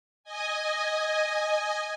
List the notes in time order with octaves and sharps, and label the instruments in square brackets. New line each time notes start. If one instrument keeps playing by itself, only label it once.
[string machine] D#5 G#5